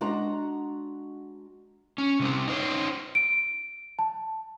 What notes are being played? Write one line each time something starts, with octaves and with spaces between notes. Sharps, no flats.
G#3 D4 F#4 A#5
C#4
C3 G3 C4
D#4 C5 C#5
D7
A5